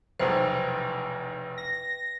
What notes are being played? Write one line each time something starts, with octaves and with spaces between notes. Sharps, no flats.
F1 B1 E2 B4 C5 E5 G5
A#6